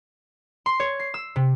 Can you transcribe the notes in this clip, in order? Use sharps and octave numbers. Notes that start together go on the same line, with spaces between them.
C6
C#5
C7
E6
C3